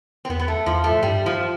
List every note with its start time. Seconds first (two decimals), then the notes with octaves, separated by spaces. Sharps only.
0.25 C4
0.29 E2 B3
0.39 B3
0.48 A3
0.66 E2 F3
0.84 A3
0.92 A2
1.02 G2 G3
1.26 F3